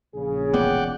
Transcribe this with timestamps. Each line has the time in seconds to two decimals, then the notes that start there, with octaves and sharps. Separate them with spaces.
0.14 A#1 C#3 G#4
0.54 E1 B3 C#4 D5 F#5 G5